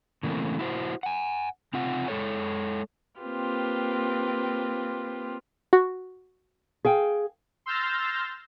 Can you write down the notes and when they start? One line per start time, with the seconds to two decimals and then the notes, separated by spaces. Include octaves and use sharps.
0.23 C#3 E3 A3 A#3 C4
0.59 E4 F#4 C5
1.03 F#5 G#5
1.73 C#3 C4 F4 F#5
2.08 G#3 A4 C#5
3.21 A#3 C4 F4 G4 B4
5.73 F#4
6.85 G#4 F5 G5
7.66 C6 E6 F6 G6 A6 A#6